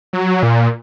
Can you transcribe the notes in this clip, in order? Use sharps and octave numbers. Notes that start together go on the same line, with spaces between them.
F#3
A#2